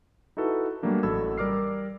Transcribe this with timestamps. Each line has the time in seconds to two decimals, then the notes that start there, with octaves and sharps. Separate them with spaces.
0.37 D#4 E4 F#4 A4 B4
0.83 F#3 G3 A3 A#3 D4
1.03 A1 F#4 A4 B5 E6 G#6
1.38 G3 A#4 D5 D6 F6 C7